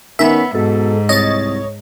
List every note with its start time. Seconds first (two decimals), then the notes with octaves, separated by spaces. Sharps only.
0.19 D#3 B3 C#4 E5
0.54 G#2 B2 A4
1.09 C2 C#5 D#5 A6